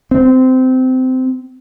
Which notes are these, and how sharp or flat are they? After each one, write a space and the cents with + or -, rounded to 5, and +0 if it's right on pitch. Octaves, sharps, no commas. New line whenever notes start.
C4 -20